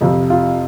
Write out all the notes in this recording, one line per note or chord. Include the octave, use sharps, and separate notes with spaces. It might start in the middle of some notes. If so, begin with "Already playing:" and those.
F2 C3 F3
F4